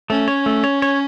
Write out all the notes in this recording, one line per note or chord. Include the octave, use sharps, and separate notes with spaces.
A3 C#4
C#5
A3
C#5
C#5